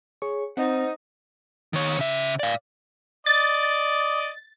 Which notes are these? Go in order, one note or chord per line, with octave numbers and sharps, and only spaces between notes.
G#4 C#5 C#6
C4 D#4 C5 F#5
D#3 C#5
C#3 E5
D5 F5
D5 D#5 A6